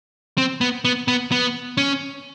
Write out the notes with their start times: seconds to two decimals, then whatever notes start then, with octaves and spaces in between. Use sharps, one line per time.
0.38 C4
0.61 B3
0.85 B3
1.08 B3
1.32 B3
1.77 C#4